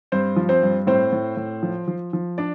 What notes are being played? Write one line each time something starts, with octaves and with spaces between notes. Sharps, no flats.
G2 C4 C5
F3
C4 C5
G2
A2 C4 C5
A2
A2
F3
F3
F3
D4 D5